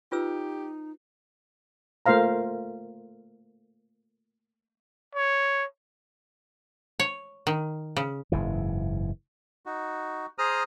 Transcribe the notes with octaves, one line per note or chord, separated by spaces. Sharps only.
D#4 F4 G4 B4 E6
A3 A#3 F4 C5 F5 A#5
C#5
C#5
D#3
C#3
F#1 G#2 E3
D#4 F#4
G#4 C5 A#5 D#6 F6